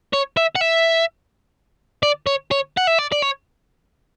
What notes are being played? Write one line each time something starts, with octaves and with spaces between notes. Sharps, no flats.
C#5
E5
F#5
E5
D5
C#5
C#5
F#5
E5
D5
D5
C#5